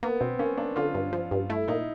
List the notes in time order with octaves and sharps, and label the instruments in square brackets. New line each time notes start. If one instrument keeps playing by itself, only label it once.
[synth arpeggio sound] A#3 [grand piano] B3
[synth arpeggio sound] B2 [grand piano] C4
[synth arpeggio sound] A#3 [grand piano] C#4
[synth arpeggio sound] A#3 [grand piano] D4
[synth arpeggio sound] D3 [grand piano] F4
[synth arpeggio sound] G2
F3
G2
[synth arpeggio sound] A3 [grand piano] E4
[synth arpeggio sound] A#2 [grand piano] D#4